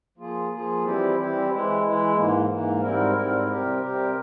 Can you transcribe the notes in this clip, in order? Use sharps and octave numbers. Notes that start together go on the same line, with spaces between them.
F3 A#3 F4 G#4
F3 A#3 F4 G#4
E3 G3 C4 E4 G4
E3 G3 C4 E4 G4
E3 G#3 E4
E3 G#3 E4
G#2 E3 A#3
G#2 E3 A#3
G#2 G3 C4 E4 A#4
G#2 G3 C4 E4 A#4
C3 G3 C4 G4 A#4
C3 G3 C4 G4 A#4